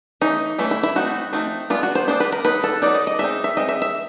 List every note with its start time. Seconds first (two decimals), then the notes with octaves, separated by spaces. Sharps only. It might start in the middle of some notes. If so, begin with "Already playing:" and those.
0.21 E3 A3 C#4 D#4
0.58 E3 A3 C#4 E4
0.71 E4
0.83 E4
0.95 F3 A3 C4 D#4 F#4
1.33 F3 A3 C4 D#4
1.70 G#3 B3 D4 F4
1.83 F#4
1.95 C5
2.08 G#3 B3 D4 C5
2.20 B4
2.32 A#4
2.45 F#3 B3 D#4 B4
2.64 A4
2.82 F#3 B3 D#4 D5
2.95 D#5
3.07 D#5
3.19 G#3 C4 D#4 E5
3.44 E5
3.57 G#3 C4 D#4 D#5
3.69 E5
3.82 E5